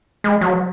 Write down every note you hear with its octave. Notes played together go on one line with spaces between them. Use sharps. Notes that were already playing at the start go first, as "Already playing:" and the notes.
G#3
F#3